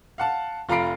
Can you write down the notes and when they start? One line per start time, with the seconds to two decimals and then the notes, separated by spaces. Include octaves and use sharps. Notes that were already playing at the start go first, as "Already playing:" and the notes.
0.18 F5 F#5 A5
0.69 F1 F4 A#5 B5 C7 D7